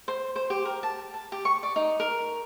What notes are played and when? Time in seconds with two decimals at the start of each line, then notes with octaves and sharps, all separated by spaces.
0.08 C5
0.36 C5
0.50 G4
0.65 A#4
0.83 A5
1.14 A5
1.32 G4
1.45 C#6
1.63 D5
1.76 D#4
2.00 A#4